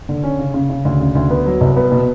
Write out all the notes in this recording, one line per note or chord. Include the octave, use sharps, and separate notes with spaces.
D3
C#4
C#3
C#3
C#3
D2
C#3
D2
B3
F#3
C2
B3
B2